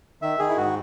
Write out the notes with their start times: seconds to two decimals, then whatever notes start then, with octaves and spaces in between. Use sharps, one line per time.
0.22 D#3 E5
0.39 D#3 G#4
0.49 E4
0.57 G#2 F#4